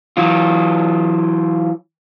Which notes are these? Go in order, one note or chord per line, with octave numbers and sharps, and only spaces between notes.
E3 F#3 F4